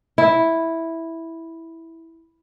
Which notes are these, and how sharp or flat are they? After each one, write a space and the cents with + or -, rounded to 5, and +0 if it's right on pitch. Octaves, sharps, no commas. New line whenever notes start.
E4 -5